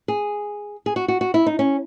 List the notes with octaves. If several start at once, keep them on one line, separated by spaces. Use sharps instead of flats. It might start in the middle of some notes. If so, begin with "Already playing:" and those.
G#4
G#4
F#4
F#4
F#4
E4
D#4
C#4